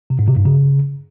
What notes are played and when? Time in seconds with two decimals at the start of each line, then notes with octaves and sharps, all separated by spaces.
0.10 C3
0.19 G#2
0.28 C3
0.36 G2
0.45 C#3